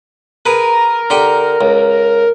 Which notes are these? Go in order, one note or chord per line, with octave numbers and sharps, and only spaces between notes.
G#4 A#4 B4
D3 G4 G5
C#2